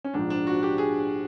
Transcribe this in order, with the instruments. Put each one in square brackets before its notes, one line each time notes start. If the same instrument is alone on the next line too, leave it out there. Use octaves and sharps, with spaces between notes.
[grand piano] C#4
A#1 G#2 F3 D4
D4
F#4
G4
G#4